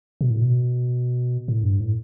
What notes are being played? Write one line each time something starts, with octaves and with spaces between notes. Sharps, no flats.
B2
A2
B2
A2
G2
A2